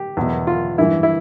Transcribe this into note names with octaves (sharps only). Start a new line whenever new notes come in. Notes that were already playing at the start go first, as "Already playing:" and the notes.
Already playing: G4
E2 B2
F4
G2 E3 E4
E4